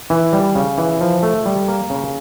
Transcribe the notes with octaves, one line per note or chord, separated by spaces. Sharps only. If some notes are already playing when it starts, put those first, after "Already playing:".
E3
G3
C#3
E3
F3
A3
G3
A#3
C#3